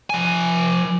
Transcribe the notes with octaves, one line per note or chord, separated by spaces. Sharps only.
F3 G#5